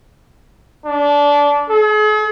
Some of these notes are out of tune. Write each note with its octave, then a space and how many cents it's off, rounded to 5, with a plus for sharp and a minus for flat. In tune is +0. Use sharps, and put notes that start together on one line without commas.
D4 -20
G#4 +45